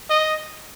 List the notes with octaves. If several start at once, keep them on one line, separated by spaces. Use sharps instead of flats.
D#5